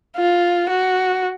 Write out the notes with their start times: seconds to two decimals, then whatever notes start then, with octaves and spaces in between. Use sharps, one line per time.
0.17 F4
0.70 F#4